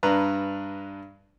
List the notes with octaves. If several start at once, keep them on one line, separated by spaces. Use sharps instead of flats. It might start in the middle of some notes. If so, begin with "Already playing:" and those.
G2 D4 B4 A#5